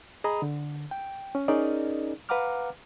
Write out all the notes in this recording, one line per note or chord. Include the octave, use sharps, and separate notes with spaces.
G#4 D#5 A#5 B5 D#6
D3
G5
C#4
C#4 D#4 G#4 A#4 D5 D#5
B4 F5 F#5 A#5 D6 F6